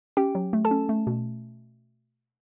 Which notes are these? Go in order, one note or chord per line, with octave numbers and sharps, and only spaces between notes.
C#4 G4 G5
F#3
A3
A4 A5
C#4
A3
B2